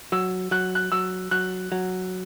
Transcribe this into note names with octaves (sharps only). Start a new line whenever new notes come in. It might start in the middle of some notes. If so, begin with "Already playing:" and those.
F#3 E6
F#3 F#6
F#6
F#3 E6
F#3 F#6
F#3